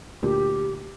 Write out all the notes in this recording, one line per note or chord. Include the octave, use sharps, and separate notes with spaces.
D2 A#2 G4